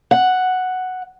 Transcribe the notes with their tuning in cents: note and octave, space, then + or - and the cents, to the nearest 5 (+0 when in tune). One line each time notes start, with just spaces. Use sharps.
F#5 +0